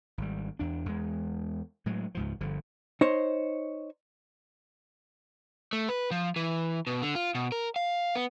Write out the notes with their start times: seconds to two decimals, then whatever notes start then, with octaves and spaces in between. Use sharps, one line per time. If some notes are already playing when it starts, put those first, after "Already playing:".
0.18 G#1 G3
0.59 E2 D4
0.86 E2 G#3
1.86 A2 F#3 G#3
2.15 C#2 G#2 F3
2.41 G1 D3 F3
3.01 D#4 C5 C#5
5.73 A3
5.89 B4
6.11 F3
6.36 E3
6.87 B2
7.02 D3
7.15 F4
7.35 B2
7.52 A#4
7.76 F5
8.15 B3